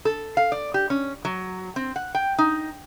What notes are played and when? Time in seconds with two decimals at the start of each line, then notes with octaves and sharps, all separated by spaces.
0.05 A4
0.37 F5
0.52 D5
0.74 G4
0.90 C#4
1.25 F#3
1.76 C4
1.96 F#5
2.15 G5
2.38 D#4